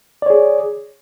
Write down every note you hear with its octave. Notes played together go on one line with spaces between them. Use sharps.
G#4 C#5 D5